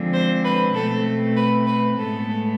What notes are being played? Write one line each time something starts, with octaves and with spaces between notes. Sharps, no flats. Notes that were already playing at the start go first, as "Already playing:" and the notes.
Already playing: D3 F3 G#3 C4
C5
B4
B2 A3 C4 A4
B4
B4
A2 G#3 B3 A4